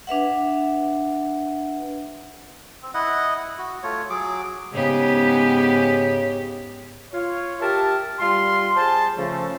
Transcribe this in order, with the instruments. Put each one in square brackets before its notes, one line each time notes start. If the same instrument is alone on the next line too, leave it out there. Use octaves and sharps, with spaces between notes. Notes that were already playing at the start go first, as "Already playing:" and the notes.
[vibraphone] D4 B4 E5 F#5
[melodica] C4
E4 D#5 F#5
F#4
A3 F4 C#5
F#3 G#4 D6
[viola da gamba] G#2 B3 G4 [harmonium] C#3
[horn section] F4 C#5
G4 A#4 E5 A5
G3 F4 C6
G#4 C5 A5
C#3 F3 A3